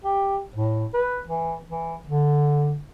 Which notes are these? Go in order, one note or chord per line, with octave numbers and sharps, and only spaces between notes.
G4
A2
B4
E3
E3
D3